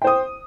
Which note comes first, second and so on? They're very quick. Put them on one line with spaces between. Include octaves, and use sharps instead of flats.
G5 C5 D#6